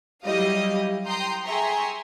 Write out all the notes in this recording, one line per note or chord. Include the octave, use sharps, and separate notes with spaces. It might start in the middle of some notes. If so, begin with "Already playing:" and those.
F#3 G3 E4 G4 D#5 F5
G5 A#5 C6 D#6 G6
G#4 E5 G5 A#5 C6 C#6